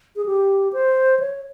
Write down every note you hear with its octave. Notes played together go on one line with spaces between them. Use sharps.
G#4
G4
C5
C#5